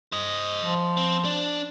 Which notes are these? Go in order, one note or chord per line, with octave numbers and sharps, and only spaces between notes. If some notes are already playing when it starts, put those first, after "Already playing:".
C5 D#5
F3
C4
D4